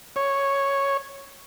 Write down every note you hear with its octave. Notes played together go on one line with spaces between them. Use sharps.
C#5